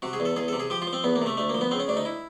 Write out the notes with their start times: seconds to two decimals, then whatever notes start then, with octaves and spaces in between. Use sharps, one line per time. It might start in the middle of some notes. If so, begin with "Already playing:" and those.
0.02 C3 F#4
0.13 G#4
0.20 E2
0.25 A4
0.36 E2 G#4
0.48 C3 A4
0.60 G#4
0.70 F3 G4
0.82 F4
0.87 F3
0.93 C4
1.04 E2 B3
1.16 A#3
1.22 C3 A3
1.37 D2 A3
1.49 F3 A#3
1.61 B3
1.71 C#3 C4
1.80 C#4
1.88 D2 D4
1.97 D#4
2.05 E4